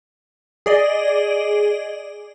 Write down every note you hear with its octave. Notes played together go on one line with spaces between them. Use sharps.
G#4 D5 D#5